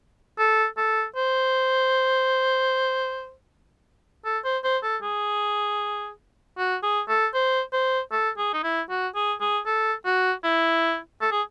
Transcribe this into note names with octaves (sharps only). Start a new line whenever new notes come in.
A4
A4
C5
A4
C5
C5
A4
G#4
F#4
G#4
A4
C5
C5
A4
G#4
D#4
E4
F#4
G#4
G#4
A4
F#4
E4
A4
G#4